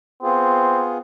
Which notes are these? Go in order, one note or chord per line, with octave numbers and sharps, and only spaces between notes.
B3 C4 F4 G#4